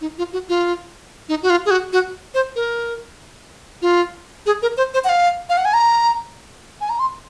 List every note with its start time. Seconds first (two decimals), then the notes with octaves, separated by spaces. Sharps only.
0.01 D#4
0.18 F4
0.33 F#4
0.49 F4
1.29 D#4
1.43 F#4
1.50 F4
1.66 G#4
1.71 F#4
1.93 F#4
2.34 C5
2.56 A#4
3.82 F4
4.46 G#4
4.62 A#4
4.77 C5
4.94 C5
5.04 F#5
5.09 F5
5.49 F5
5.57 F#5
5.65 G#5
5.74 A#5
6.81 G#5
6.89 A#5
6.99 C6